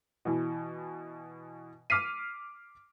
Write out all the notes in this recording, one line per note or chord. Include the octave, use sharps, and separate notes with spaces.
B2 E3
D6 F6 B6 C7 D#7